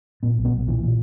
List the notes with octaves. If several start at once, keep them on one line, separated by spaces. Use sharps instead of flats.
A#2 B3
B1
B3
B1
A#2 E3
A#2